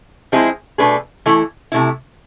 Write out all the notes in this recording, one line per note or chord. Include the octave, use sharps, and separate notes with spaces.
F3 G#3 C4 E4 G#4
B2 A3 D4 G#4 B4
E3 A3 E4
C3 E3 A3 E4